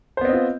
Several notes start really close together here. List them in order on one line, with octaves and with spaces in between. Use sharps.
C5 B3 C4 D#5 F4